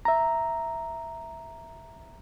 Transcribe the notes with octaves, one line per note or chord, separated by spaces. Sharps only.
E5 A#5